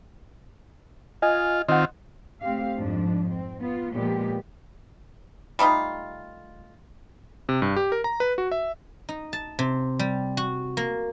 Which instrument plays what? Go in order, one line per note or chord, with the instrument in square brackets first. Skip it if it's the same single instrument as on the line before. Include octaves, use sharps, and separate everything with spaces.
[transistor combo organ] F4 [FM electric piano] D#5 G#5
[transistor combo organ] D#3 C4 F4 [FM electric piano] D#5 F#5
[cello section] A3 C4 G4 F5
F2 G#2 F3 D4
C4
B3 F4
A#2 F3 G#3 B3 G4
[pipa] G3 A3 D#4 F4
[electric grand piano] C3
G2
G4
A#4
A#5
B4
F#4
E5
[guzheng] D#4
A5
C3
G3
F#4
A#3